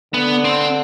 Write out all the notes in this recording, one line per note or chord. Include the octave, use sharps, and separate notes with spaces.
D3 B3
C4